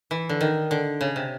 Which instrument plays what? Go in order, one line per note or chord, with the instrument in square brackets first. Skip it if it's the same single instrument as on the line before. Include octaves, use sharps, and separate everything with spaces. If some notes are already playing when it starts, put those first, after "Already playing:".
[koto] E3
D3
D#3
D3
C#3
C3